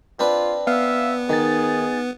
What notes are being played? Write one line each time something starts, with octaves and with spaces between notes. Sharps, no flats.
C4 D4 F4 B4
B3 E5 F5
D#3 D#4 G#4 A6